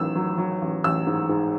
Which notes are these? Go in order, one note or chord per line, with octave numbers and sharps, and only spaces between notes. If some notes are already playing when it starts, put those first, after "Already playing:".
Already playing: A1 G#2 D#3 F#3 E6
F#3
F#3
A1
A1 E6
G#2
G#2